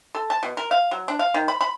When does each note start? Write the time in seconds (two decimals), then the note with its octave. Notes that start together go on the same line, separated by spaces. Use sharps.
0.15 A4
0.30 A5
0.43 B2
0.57 A#4
0.71 F5
0.91 F#3
1.08 D4
1.19 F5
1.34 D#3
1.48 B5
1.61 B5